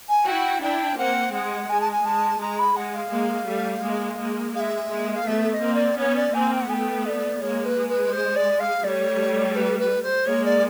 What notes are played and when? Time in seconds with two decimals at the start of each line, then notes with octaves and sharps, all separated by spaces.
0.09 G#5
0.26 E4 F#4 G5
0.62 D4 E4 G5
0.98 A#3 C4 F#5
1.33 G#3 F#5
1.69 G#3 G#5
1.81 A5
1.92 G#5
2.05 G#3 A5
2.40 G#3 A#5
2.59 B5
2.76 G#3 F#5
2.95 F5
3.12 G#3 A#3
3.48 G3 A3
3.83 G#3 A#3
4.19 G#3 A#3
4.55 G#3 E5 F5
4.90 G#3 A#3
5.15 F5
5.26 A3 B3 E5
5.50 E5
5.53 D#5
5.62 A#3 C4
5.74 D5
5.98 B3 C#4 C#5
6.16 D5
6.33 A#3 C4 G#5
6.51 G5
6.61 F#5
6.69 A3 B3 G#5
6.73 G5
7.05 D#5
7.09 D5
7.41 G#3 A#3 C#5
7.65 B4
7.76 G#3
7.88 B4
8.12 C5
8.36 D5
8.60 F5
8.84 G3 A3 C#5 D5
9.55 B4
9.79 B4
10.02 C5
10.26 G#3 A#3 C#5
10.44 D5